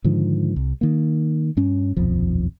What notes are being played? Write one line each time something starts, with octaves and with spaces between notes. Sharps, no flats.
G#2 D3 D#3 F3
C2
D#3 A#3
G2 C#4
D#1 B1 F2 F3